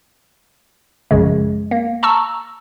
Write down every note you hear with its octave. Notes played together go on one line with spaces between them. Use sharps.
A#1 F#2 C#3 G#3
A#3
A5 A#5 C#6 E6